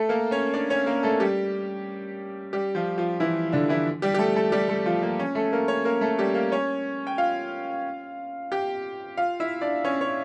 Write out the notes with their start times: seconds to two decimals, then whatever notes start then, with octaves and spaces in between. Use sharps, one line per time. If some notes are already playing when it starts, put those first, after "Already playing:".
Already playing: A3 A4
0.09 A#3 A#4
0.31 C#4 C#5
0.54 D4 D5
0.70 C#4 C#5
0.86 A#3 A#4
1.03 A3 A4
1.20 G3 G4
2.53 G3 G4
2.75 F3 F4
2.98 F3 F4
3.20 E3 E4
3.52 D3 D4
3.69 E3 E4
4.02 G3 G4
4.14 G4
4.19 A3 A4
4.36 A3 A4
4.52 G3 G4
4.69 A3 A4
4.86 F3 F4
5.03 A#3
5.19 C#4
5.35 A3 A4
5.53 A#3 A#4
5.68 C#4 C#5
5.85 A#3 A#4
6.01 A3 A4
6.19 G3 G4
6.35 A#3 A#4
6.52 C#4 C#5
7.07 G5
7.18 F4 F5
8.52 G4 G5
9.17 F4 F5
9.40 E4 E5
9.61 D4 D5
9.84 C#4 C#5
10.01 C#4 C#5